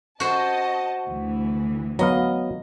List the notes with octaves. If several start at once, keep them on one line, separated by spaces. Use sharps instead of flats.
F#4 C5 D#5 A5
D2 E3
F#3 B3 D#5 F5